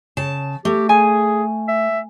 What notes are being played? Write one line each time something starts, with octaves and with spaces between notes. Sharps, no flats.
C#3 A5
A3 G4
G#4 G#5
E5